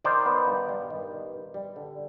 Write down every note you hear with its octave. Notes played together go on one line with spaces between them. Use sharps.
D#3 C5 D5
B3
G2
G3
D#3
B3
G2
G3
D3